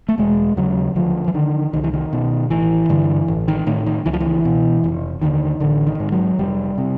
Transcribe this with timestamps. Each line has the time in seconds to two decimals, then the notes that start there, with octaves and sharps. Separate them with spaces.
0.09 A3
0.18 E1 G#3
0.57 D#2 C#3 F#3
0.96 D2 F3
1.28 E3
1.34 D3 D#3
1.73 C2 D#3
1.84 E3
1.93 D#3
2.13 B2
2.50 A1 E3
2.89 G2 D3
3.28 A1
3.48 D#3
3.67 A2 D#3
3.86 D#3
4.06 C#2 E3
4.13 F3
4.20 E3
4.45 B2
4.84 F1
5.22 D#2 D3 D#3
5.60 A1 D3
5.87 D#3
6.00 G#2
6.12 F#3
6.39 F1 G3
6.78 C3